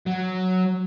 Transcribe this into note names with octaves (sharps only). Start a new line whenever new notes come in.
F#3